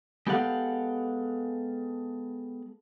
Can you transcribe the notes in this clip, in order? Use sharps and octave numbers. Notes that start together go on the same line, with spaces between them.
G#3 B3 G4 A4 F5 F#5